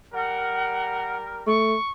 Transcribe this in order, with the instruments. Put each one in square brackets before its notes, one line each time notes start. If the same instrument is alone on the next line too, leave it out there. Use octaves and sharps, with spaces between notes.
[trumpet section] G3 A#4 [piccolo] F#5
[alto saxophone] A3 [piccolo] C#6